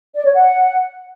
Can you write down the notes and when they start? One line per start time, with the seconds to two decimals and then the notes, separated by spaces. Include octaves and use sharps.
0.15 D5
0.24 C#5
0.33 F#5